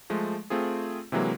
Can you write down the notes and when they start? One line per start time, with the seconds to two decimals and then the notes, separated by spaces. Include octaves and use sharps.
0.10 F3 G#3 A3
0.50 A3 C4 F4 G#4
1.12 C3 E3 F#3 G#3 A#3